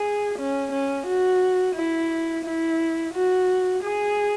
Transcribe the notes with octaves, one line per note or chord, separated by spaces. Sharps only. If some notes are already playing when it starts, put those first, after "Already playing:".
Already playing: G#4
C#4
C#4
F#4
E4
E4
F#4
G#4